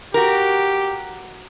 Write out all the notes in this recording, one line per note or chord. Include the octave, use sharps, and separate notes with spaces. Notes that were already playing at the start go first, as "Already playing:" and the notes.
F#4 G4 A#4